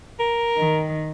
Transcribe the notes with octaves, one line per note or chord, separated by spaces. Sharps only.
A#4
D#3